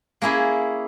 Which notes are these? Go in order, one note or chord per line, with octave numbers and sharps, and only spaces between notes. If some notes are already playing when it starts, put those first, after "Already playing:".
A#3 C#4 E4 G#4